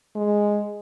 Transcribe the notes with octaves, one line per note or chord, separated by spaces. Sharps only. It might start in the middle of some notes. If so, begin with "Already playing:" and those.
G#3